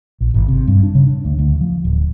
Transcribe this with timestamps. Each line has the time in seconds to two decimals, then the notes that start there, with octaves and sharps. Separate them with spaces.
0.21 A#1
0.34 G#1
0.48 C3
0.67 G2
0.83 D4
0.95 C#3
1.07 D4
1.25 D2
1.39 D2
1.61 F3
1.85 D1